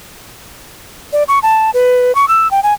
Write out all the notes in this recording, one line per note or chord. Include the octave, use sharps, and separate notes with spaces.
D5
C#6
A5
B4
C#6
E6
G5
G#5